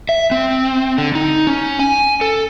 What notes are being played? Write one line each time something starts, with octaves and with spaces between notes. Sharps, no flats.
E5
C4
D3
D#4
C#4
G#5
A4